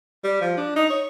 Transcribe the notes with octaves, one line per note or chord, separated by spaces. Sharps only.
G3
F3
D4
D#4
C#5